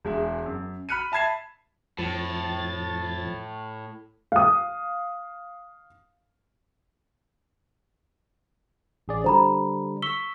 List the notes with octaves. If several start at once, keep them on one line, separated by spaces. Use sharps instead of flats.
E1 G#3 E5
F#2
B5 F6 F#6 C#7 D#7
E5 A5 B5 G#6 C7 E7
F2 A2 F3 A6
F5 D#6
A1 G#4 D5
D3 G3 C5 A#5 B5
C#6 E6 B6 G7